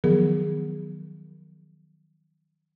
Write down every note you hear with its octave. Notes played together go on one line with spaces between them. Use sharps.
D#3 F3 F#3 B3 G#4 A#4